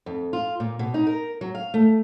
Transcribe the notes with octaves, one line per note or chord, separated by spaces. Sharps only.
F2
F4
A#2
B2
D#4
A#4
F#3
F5
A3